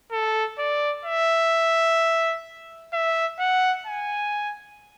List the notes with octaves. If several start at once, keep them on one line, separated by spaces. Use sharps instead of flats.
A4
D5
E5
E5
F#5
G#5